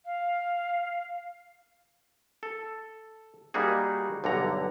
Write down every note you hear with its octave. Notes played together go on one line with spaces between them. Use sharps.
F5
A4
G3 A#3 D#4 F#4 G#4
B1 G2 D3 F#5 A#5